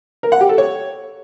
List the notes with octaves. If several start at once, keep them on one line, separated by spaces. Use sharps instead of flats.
A#4
F#5
G4
A4
C#5